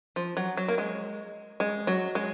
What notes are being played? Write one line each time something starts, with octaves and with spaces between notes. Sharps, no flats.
F3
F#3
F#3
A#3
G#3
G#3
F#3
G#3